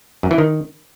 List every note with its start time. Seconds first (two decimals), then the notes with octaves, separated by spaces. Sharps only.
0.23 F#2
0.31 E3
0.38 D#3